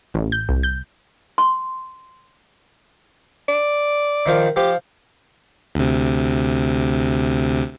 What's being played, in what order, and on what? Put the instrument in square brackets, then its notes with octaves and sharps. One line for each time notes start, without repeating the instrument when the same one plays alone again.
[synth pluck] A1
G6
C2
G6
[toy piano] C6
[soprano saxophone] D5
[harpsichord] D#3 F3
[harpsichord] F3 [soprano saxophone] G4
[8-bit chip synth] D2 C3